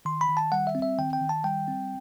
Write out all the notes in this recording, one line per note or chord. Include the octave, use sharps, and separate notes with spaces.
D#3 C6
B5
D#3
A5
G3 F#5
E5
C4
E5
D#3 G5
G5
D#3
A5
G3 G5
C4